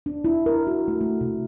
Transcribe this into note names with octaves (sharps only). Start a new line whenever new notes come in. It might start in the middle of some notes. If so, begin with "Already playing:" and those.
D4
E4
A#4
F#4
A3
A3
C3